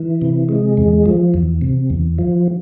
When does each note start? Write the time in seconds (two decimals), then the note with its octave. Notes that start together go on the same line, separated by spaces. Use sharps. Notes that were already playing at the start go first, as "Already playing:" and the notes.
Already playing: E3
0.22 C3
0.49 G#3
0.77 E2
1.06 F3
1.34 E2
1.61 C3
1.90 E2
2.18 F3